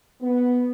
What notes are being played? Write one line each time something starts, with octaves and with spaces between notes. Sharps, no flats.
B3